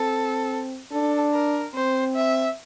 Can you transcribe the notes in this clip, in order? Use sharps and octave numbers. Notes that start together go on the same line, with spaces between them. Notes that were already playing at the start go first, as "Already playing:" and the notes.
Already playing: C4 A4
D4 A4
A#4
C4 C5
E5